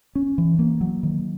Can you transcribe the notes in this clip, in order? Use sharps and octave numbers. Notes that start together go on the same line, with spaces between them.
C#4
E3
A#3
F#3
D#3